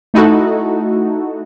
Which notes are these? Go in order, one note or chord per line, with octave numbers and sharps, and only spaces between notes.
A3 D#4 E4 F#4 A4